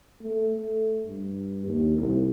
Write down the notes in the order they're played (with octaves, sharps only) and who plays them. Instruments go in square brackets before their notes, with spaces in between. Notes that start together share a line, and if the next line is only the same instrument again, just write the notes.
[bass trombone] A3
A3
G2
D#2
C2